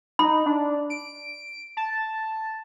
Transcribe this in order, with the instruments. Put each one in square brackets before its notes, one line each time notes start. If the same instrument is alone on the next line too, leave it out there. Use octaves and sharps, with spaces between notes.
[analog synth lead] D#4 [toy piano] B5
[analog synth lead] D4
D7
A5